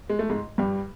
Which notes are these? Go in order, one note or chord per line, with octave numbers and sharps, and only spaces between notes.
G#3
A3
G#2 G#3
G2 G3